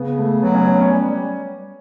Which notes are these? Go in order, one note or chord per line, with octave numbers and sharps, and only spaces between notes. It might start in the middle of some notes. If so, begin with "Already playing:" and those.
Already playing: C#3 B3
A3
F#3 B3
C#4
C#4
C#4
G3
G3